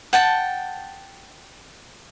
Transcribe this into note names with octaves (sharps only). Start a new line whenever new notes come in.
F#5 G5 A5